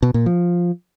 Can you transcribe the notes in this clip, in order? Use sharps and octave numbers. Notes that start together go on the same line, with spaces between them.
B2
A#2
F3